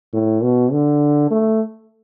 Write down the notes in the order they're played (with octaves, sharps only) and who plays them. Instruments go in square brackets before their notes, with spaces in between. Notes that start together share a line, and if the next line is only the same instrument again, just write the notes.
[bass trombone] A2
B2
D3
A3